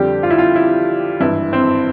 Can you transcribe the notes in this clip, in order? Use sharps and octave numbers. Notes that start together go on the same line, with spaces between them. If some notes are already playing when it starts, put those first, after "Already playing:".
Already playing: F2 D3 G3 G4
F4
E4
F4
E4
G#1 G2 E3 E4
C4